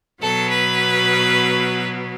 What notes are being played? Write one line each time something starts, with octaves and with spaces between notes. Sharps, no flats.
B2 F#3 B3 A4
B4